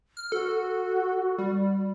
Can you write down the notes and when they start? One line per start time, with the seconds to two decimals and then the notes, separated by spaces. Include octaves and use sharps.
0.17 F6
0.32 F#4 A4
1.38 G3